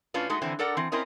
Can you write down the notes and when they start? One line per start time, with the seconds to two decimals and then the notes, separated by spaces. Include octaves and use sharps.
0.14 A2 C#4 D4 F4 B4
0.30 G#3 A3 D#4 F#4
0.42 D3 E3 C4 E4
0.59 D4 A4 A#4 D5 F#5
0.77 E3 C4
0.92 C4 C#4 E4 A#4 D#5